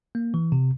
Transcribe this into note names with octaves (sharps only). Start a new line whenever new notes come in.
A#3
E3
C3